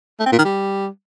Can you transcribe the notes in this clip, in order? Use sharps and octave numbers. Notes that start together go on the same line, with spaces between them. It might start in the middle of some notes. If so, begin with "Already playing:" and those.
A3
C4
A#2
D#3
G3